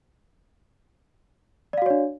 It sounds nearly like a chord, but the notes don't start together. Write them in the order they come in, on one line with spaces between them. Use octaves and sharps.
D5 F5 F#4 C#5 D4